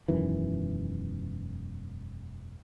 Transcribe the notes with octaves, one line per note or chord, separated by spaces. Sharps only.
E1 F#2 D#3 E3